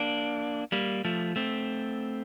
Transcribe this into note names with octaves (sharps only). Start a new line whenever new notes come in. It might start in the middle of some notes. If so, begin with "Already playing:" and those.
Already playing: A#3 D4
G3 A#3
F3 A3
A3 C4